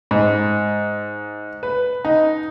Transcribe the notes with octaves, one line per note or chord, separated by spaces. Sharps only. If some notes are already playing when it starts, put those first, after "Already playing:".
G#2
B4
D#4